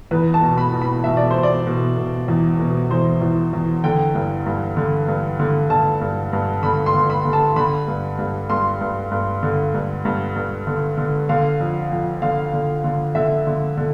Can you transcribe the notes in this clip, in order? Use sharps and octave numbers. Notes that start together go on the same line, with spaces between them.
E2 B4
A5
B2
B5
B2
B5
B2 E5
D5
B2 C5
D5
B2
B2
E2
B2
E2 C5
E2
E2
D3 G5
G2
G2
D3
G2
D3
D3 A5
G2
G2
D3 B5
C6
D3
B5
D3
A5
D3 B5
G2
G2
G2 C6
G2
G2
D3
G2
G2
G2
D3
D3
D3 F5
F2
F2
D3 F5
D3
D3
D3 E5
D3
D3